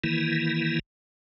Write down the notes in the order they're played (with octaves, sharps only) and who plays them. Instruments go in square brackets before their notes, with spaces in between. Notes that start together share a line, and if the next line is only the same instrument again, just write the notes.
[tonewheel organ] D#3 E3 A#3 E4